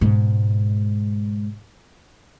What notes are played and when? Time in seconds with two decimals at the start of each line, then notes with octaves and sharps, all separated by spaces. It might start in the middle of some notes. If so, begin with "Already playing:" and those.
0.01 G#2 B2